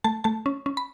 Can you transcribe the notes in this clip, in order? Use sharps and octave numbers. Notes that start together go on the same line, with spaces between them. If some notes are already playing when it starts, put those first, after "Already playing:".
A3 A5
A3 A5
C#4
C#4
B5